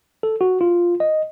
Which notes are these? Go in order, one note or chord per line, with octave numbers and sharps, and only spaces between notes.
A4
F#4
F4
D#5